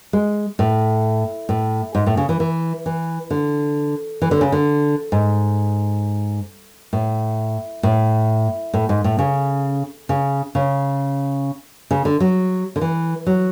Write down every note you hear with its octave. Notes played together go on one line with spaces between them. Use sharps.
G#3
A2
A2
G#2
A2
C#3
E3
E3
E3
D3
E3
D3
C#3
D3
G#2
A2
A2
A2
G#2
A2
C#3
C#3
C#3
C#3
D3
F#3
D3
E3
F#3